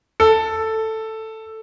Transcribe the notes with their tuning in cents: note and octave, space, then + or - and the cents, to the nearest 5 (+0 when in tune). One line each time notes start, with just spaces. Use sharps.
A4 +5